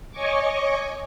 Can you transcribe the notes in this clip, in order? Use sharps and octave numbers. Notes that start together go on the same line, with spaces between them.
C#5 D#5 G#5 C#6 D6